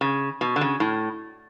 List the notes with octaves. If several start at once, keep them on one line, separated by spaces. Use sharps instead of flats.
C#3
B2
D3
C#3
A2